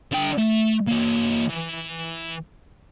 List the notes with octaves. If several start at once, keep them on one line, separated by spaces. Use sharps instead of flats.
D3 G5
A3
E3 A#3
E3